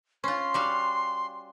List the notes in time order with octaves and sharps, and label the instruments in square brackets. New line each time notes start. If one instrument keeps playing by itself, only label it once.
[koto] C#4 F4 [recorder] C6
[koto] G3 F#4 F5